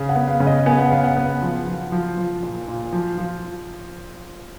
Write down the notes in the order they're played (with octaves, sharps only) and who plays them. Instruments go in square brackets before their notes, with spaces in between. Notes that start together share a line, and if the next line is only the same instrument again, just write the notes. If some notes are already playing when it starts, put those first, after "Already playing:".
Already playing: [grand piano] C#3
[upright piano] F#5
[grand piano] B3
[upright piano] F5
[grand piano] C#3
[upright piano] D#5
[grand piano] B3 [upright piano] G#5
[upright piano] F#5
[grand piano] C#3 [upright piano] F5
[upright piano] F#5
[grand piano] B3
F3
F3
F3
F3
A#2
A#2
F3
F3